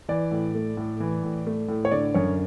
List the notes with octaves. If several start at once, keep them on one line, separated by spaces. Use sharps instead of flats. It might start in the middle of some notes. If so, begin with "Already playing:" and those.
E3 D5
A2
A3
A2
E3
A2
A3
A2
C#5
D3 D5
F#2 C#5